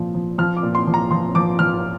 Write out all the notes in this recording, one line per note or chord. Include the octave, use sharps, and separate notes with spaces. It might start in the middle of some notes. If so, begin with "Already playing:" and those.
Already playing: A#2 F3
F3
F3 F6
D6
A#2
C6
F3
A#5
F3 C6
F3 D6
F3 F6